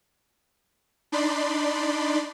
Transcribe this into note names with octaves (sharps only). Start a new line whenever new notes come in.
D4 D#4 D5 B5 C6